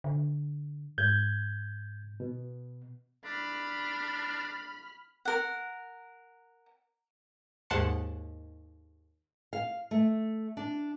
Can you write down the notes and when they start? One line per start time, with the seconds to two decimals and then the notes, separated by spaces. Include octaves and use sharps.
0.04 D3
0.98 G#2 G6 G#6
2.20 B2
3.25 D4 B5 F6
5.25 A#4 F#5
7.70 D#2 G#2 F#5 A5 C6 C#7
9.53 F5
9.91 A3
10.57 D4